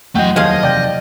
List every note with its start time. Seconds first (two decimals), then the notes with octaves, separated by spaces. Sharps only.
0.15 F2 E3 F#3 A3 D#5 F#5 G5 G6
0.36 D#2 F3 G#4 D#5 F5
0.63 C3 D5 G5 G6